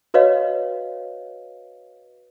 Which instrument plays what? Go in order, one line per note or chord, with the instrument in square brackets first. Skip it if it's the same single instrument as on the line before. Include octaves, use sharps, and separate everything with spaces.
[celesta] F#4 B4 C#5 D#5 F5